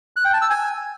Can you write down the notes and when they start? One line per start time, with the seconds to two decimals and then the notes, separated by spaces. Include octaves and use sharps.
0.16 F#6
0.25 G5
0.33 A5
0.42 E6
0.50 G#5